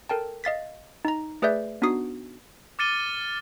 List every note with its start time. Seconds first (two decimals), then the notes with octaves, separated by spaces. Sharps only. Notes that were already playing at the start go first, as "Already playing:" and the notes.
0.09 A4 A#4 G5 A5
0.44 D#5 F5 A6 B6
1.05 D#4 A#5
1.42 A3 G#4 B4 D5 E5 G6
1.82 B3 D4 D#4 F#4 D#6 C7
2.79 D6 F6 A6 C#7 D#7 G7